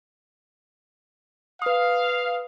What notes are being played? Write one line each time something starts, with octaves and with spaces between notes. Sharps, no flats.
B4 F5 D#6